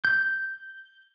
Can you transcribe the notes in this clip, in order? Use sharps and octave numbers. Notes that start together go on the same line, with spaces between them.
G6